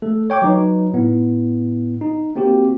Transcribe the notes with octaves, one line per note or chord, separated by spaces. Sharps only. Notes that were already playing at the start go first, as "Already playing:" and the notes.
A3 A4
C#5 G5 C#6 D6
F#3 D#4 B4
A2 B3 E4
D#4
A#3 C4 F#4 G4